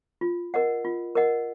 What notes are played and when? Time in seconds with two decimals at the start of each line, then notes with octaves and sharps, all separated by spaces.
0.21 F4
0.54 A#4 D#5 F#5
0.85 F4
1.15 A#4 D#5 F#5